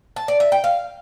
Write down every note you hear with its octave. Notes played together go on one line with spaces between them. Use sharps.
A5
D5
E5
G5
F5